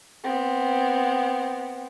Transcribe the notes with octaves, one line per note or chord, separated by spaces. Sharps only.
B3 C4